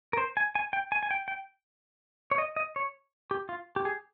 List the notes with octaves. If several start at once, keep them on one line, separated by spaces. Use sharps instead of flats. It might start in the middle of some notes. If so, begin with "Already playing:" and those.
A#4
C5
G#5
G#5
G5
G#5
G#5
G5
G5
C#5
D#5
D#5
C#5
G4
F4
G4
G#4